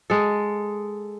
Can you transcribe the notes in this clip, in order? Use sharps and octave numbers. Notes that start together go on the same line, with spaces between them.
G#3 A4